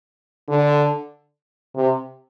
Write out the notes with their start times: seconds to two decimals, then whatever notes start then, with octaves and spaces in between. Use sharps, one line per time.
0.48 D3
1.75 C3